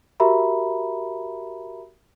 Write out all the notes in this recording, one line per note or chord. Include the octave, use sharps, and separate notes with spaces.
F#4 G4 A#4 E5 A#5 B5